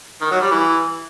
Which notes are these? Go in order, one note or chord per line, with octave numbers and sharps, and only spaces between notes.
D#3
F#3
G3
E3